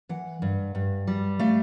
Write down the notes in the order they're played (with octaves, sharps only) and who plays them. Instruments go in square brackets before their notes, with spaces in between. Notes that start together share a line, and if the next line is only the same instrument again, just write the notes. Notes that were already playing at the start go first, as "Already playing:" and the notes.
[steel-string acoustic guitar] E3 F#5
G2
G2
G3
A3 F5